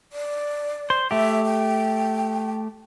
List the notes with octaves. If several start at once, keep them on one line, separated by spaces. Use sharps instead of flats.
D5
C5
A3 G4 E5
G5